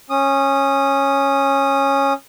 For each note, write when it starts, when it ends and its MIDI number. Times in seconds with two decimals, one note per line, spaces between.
0.10 2.13 61
0.10 2.13 87